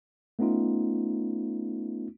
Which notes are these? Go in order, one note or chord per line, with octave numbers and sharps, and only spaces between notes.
A3 B3 C#4 D#4 F4